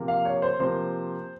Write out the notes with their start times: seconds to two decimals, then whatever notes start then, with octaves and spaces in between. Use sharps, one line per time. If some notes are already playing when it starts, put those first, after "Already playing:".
Already playing: C3 F3 A#3
0.08 F5
0.25 C#5
0.42 C5
0.59 C3 F3 A#3 C5